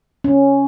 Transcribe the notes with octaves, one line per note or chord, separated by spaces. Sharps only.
C#4